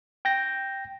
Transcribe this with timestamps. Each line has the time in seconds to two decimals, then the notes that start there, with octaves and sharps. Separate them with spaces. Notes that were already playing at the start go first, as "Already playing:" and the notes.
0.25 G5 G6 A#6